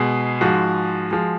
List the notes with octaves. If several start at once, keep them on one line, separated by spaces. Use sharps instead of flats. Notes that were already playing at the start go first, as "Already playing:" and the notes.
Already playing: B2 G#3
G#2 F3 G#3 F#4
F3 G#3